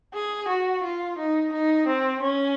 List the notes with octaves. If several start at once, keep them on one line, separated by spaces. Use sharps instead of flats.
G#4
F#4
F4
D#4
D#4
C4
C#4